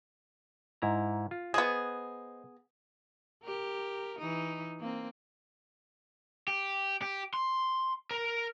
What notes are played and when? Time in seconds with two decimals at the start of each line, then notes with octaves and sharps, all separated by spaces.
0.82 G#2 E4 A#5
1.31 F4
1.54 B3 G#4 C5 D#5
3.43 G4 A#4
4.19 E3 D#4
4.80 A#3 C4
6.48 G4
7.02 G4
7.34 C6
8.11 A#4